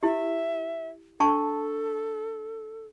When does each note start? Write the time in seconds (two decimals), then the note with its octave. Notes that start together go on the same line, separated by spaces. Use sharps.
0.03 E4 G4 E5
1.20 D4 A4 A5 C#6